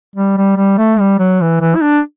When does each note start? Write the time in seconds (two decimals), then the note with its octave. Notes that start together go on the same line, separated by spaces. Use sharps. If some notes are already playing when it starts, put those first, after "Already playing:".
0.16 G3
0.37 G3
0.57 G3
0.78 A3
1.00 G3
1.19 F#3
1.41 E3
1.61 E3
1.76 E4
1.82 D4